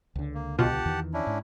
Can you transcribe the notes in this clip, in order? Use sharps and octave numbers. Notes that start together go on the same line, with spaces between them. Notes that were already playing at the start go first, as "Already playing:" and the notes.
C#2 D3
A#3
B1 B2 F4 G4 F#5 A5
E2 D#3 E3
C#4 D4 E4
G#2